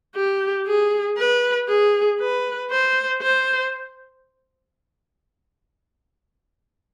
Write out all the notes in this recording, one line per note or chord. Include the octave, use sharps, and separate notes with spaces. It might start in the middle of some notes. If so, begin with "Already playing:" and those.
G4
G#4
B4
G#4
B4
C5
C5